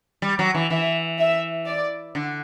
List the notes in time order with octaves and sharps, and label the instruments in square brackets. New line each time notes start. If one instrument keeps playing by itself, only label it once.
[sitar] G3
F#3
E3
[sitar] E3 [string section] E5
[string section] E5
D5
[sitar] D3